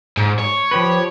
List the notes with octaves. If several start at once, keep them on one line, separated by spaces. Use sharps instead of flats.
G#2
C#5
F3 G4 B4